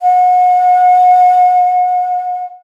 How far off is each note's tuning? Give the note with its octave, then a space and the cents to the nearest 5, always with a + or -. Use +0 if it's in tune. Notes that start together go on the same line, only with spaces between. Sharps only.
F#5 -35